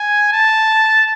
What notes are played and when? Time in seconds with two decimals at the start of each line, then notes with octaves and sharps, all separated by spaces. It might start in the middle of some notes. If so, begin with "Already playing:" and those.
Already playing: G#5
0.32 A5